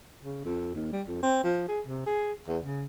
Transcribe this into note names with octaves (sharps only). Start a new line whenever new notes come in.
C#3
F2
D#2
G3
F2
C4
F3
G#4
C3
G#4
E2
C#3